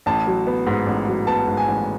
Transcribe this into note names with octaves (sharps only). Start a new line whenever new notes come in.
A1 A5
F#3
B3
G#2
A1
F#3
B3 A5
G#2
G#5
A1